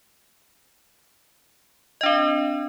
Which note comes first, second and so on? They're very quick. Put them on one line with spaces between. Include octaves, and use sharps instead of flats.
D#5 D4 C4